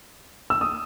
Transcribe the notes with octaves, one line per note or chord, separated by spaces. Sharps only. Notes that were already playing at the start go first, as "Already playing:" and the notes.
E6
D#6